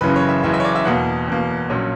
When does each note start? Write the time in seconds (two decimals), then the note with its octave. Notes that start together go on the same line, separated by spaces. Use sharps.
0.01 F#1 F#2 C#3 E3 B4
0.16 C#5
0.29 E5
0.43 F#1 F#2 C#3 E3 E5
0.54 E5
0.60 C#5
0.64 D5
0.75 E5
0.85 E2 B2 A#3 F#5
1.28 E2 B2 A#3
1.70 A#1 A#2 F#3 C#4